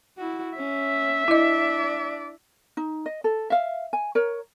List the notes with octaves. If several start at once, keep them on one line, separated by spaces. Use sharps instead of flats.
E4 F#4
C#4 E5
D4 E4 D5 D#5
D#4
D#5
A4
E5 F5
G#5
A#4 C#5